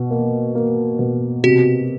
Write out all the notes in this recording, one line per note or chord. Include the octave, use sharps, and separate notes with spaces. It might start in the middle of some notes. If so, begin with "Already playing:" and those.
Already playing: B2
A#3
A#3
B2
C3 F#4